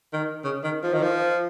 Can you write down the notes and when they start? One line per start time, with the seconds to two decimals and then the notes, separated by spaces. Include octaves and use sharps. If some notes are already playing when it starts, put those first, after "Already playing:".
0.13 D#3
0.44 C#3
0.64 D#3
0.83 F3
0.93 D#3
1.02 F3